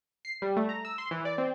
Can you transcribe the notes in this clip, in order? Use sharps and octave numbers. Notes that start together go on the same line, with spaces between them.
C7
G3
A3
A#5
E6
C6
E3
D5
C4